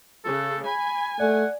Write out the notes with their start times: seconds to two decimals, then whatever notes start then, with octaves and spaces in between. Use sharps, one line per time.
0.25 C#3 A4
0.66 G#5 B5
1.20 A3 D5 F#5